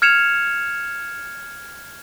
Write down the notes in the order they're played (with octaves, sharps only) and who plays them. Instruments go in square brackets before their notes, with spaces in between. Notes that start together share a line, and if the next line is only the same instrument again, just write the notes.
[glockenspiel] F6 G#6 C#7 E7 F7